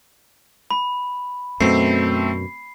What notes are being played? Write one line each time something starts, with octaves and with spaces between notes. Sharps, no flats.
B5
F#2 B2 A3 C4 C7